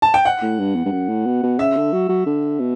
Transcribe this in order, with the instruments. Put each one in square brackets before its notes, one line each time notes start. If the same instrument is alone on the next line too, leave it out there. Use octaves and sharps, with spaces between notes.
[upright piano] A5
G5
F#5
[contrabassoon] A2
G2
E2
G2
F#2
A2
B2
B2
[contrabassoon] C#3 [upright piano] E5
[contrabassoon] D3
F#3
F#3
D3
B2